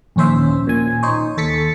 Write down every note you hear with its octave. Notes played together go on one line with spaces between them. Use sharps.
A#1 D#2 C#4 C5 E5
A#2 G#5
D#4 C5 C#5
D#2 A4 A6 B6 C#7